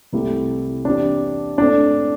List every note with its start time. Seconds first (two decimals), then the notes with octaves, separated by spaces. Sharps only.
0.13 C2 C3 A3 E4 G4
0.85 E2 E3 C4 D4 E4 G4
1.58 A2 A3 C4 D4 A4